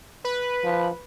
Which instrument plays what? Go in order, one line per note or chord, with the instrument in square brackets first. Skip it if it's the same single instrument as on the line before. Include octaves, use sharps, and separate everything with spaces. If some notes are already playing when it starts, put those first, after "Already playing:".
[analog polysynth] B4
[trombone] F3